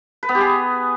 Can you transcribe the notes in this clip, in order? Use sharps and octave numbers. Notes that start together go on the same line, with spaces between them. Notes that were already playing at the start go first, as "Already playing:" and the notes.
B4
B3
G4
G#4